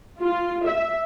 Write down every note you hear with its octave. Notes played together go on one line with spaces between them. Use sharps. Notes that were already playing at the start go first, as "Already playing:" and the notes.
F4
E5